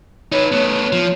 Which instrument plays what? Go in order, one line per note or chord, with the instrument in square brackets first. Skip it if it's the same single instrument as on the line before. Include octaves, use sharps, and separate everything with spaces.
[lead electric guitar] D#4 B4 [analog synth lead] C#5
[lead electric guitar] A3 B3
F3